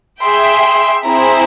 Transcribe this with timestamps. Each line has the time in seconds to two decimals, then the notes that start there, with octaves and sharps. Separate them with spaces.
0.21 G#4 E5 G5 C6
1.05 C4 E4 G#4 C5 A#5